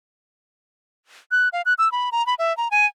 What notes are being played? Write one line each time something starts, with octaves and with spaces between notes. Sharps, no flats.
F#6
F5
F#6
E6
B5
A#5
B5
E5
A#5
G#5